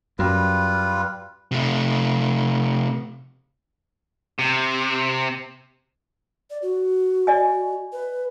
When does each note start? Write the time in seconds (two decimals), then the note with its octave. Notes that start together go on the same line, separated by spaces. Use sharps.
0.19 F#2 G3 F4 B4
1.52 C3 A3
4.39 C3
6.50 D5
6.62 F#4
7.27 D5 D#5 G#5
7.92 B4